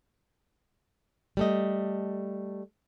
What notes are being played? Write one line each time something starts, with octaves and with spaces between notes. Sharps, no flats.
G3 A3 D#5